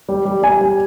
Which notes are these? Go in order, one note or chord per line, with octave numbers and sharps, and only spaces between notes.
G3
G3
G3 G#5
G3